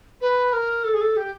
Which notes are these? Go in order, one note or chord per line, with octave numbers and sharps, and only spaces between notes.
B4
A#4
A4
G#4
A4
G4